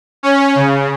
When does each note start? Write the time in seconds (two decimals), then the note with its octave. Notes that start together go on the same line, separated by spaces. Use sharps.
0.23 C#4
0.55 C#3